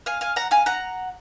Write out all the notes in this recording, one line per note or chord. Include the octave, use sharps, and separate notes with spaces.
F5 G#5
F5 G#5
F#5 A#5
F5 G#5
F#5 A#5